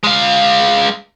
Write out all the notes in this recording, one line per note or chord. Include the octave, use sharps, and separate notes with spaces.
G#3 F5